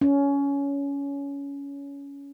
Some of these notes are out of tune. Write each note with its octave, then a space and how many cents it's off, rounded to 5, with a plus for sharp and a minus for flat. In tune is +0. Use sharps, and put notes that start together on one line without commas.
C#4 +20